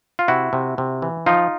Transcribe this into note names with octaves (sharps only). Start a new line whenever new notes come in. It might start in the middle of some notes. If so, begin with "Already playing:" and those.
F4
C3 E4 F#4
C3
C3
E3
F3 D#4 F4